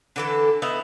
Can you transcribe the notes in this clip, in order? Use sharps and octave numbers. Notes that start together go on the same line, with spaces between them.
D3 E3 A4
B3 D#4 E4 E5